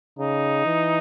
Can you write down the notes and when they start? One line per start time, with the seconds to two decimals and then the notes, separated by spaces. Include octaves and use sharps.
0.19 C#3 D#4
0.66 E3